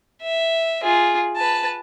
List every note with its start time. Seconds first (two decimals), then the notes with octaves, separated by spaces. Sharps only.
0.22 E5
0.83 F4 G#4
1.36 B4 A5